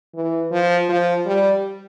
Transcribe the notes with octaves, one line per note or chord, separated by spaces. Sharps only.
E3
F3
F3
G3